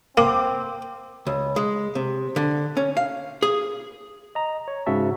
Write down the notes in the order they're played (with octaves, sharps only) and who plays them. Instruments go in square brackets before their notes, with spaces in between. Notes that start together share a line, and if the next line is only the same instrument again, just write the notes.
[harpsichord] A#3 [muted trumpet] C4 [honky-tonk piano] D6
[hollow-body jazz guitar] C#2
G#3
C3
D3
C#4
F5
G#4
[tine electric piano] D#5 A#5
C#5
G#2 C#3 F#4 E5 A5